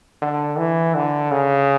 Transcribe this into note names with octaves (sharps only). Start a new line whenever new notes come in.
D3
E3
D3
C#3